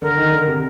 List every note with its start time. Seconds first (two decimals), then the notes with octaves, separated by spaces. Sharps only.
0.02 D3 A#4
0.17 D#3
0.32 D3
0.47 C3